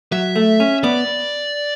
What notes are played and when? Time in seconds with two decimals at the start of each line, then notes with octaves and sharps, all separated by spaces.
0.12 F#3 E5
0.36 A3
0.60 C#4
0.84 B3 D5